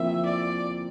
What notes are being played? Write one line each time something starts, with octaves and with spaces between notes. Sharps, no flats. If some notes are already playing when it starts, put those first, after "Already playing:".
Already playing: F3 A#3 C4 E4 F4 E5
D5